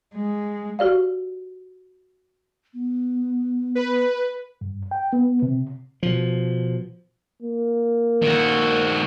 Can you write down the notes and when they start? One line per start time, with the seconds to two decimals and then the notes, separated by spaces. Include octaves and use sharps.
0.15 G#3
0.79 F#4 G4 D5 F5
2.74 B3
3.75 B4
4.61 G2
4.91 G5
5.13 B3
5.42 C3
6.03 B2 F3
7.43 A#3
8.22 D#3 F#4